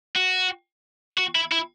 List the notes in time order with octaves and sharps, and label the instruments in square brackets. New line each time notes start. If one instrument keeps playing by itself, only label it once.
[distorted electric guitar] F#4
F#4
E4
E4